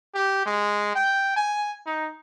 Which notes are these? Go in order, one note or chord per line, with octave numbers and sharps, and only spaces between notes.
G4
G#3
G5
G#5
D#4